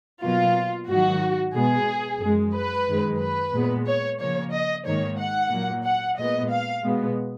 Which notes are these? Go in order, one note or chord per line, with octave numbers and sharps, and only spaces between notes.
B2 F#3 A#3 F4
G#2 D#3 F#3 F#4
B2 G#3 B3 G#4
F#2 F3 G#3
B4
F#2 D#3 G#3
B4
A#2 G#3 B3
C#5
C#3 F3 A#3 C#5
D#5
G#2 D#3 A#3 C#5
F#5
A#2 F#3 A#3
F#5
A#2 G#3 B3 D#5
F5
B2 G#3 B3